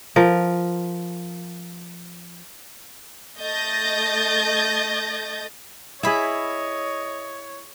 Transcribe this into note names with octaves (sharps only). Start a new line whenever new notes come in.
F3 A#4
A3 D#5 G6 A6 A#6
E4 G#4 C#5 D#5 E5 B5